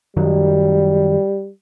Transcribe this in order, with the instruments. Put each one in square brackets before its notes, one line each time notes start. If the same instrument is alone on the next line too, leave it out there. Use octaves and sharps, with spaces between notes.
[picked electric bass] F#2 D#3 F#3 [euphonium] G3